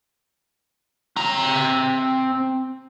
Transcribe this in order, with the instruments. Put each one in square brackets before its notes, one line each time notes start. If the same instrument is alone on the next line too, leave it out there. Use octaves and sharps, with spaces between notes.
[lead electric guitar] C4 A#5